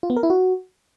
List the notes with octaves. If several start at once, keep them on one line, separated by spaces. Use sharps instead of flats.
F4
B3
A#4
E4
F#4